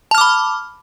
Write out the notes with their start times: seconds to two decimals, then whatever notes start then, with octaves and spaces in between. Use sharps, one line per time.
0.11 A5
0.15 F6
0.18 D6
0.21 B5